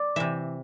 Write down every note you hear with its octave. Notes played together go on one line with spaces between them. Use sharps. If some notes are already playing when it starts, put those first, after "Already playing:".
Already playing: D5
C3 E3 E5